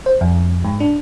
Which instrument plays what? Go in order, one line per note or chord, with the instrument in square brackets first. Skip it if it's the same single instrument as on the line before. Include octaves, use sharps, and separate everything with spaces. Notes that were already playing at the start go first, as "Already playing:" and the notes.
[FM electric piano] C5
F2
G#2
D4